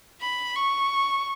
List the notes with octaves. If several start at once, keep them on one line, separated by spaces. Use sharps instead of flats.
B5
C#6